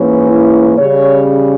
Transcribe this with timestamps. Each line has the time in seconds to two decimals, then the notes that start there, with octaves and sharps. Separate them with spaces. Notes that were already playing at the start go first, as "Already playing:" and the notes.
Already playing: G#2 E3 A#3 C#4
0.26 E4
0.78 C#3 G3 C#4 C#5